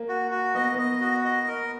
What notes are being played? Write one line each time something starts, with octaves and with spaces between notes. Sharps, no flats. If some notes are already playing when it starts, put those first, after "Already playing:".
Already playing: A#3
F#4
F#4
B3 D#5
B3 D#5
F#4
D#5
A#4